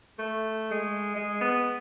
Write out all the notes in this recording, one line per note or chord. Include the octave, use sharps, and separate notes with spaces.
A3
G#3
G#3
B3